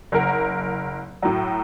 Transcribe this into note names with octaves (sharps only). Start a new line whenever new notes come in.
F#1 A#4 F#5
A2 F#3